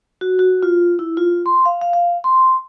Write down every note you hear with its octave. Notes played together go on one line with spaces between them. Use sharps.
F#4
F#4
F4
E4
F4
C6
F5
F5
F5
C6